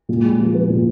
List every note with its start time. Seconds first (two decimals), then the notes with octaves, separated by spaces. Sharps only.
0.09 A#2
0.24 G#3
0.39 F3
0.54 B3
0.69 A#2